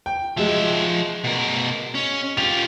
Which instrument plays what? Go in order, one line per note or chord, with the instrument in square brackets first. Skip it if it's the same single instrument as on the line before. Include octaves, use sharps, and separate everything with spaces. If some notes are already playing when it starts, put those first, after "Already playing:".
[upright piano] G5
[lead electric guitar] F3 E5 [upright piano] F#3 G#3
[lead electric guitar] B2 A#4
C#4
[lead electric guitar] F4 G4 [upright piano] F7